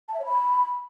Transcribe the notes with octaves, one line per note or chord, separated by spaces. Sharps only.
A5
E5
C#5
B5